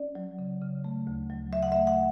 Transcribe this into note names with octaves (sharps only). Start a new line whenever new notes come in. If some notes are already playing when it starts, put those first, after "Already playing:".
Already playing: C#4 D5
F#3
C#3
C#3
A3
D2
F#3
C#3 E5
F#5
E5
A3
F#5